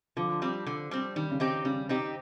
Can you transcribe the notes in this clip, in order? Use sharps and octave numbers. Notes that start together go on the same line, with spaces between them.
D3 F3
G3 C4
D3
G3 C4
D#3 G3
C#3
C4 D#4 G4
C#3 G3
C4 D#4 G4